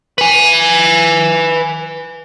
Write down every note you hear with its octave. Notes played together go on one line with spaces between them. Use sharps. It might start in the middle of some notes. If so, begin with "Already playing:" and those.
B4 G#5